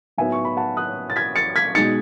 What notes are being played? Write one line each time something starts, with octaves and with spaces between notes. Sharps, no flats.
A2 F#3 B3 D#4 E5 G#5
C#6
B5
F#5 A5
D#6 F#6
A6
G#6 B6
A6 C#7
G#6 B6
B2 G#3 D#4 A6 C#7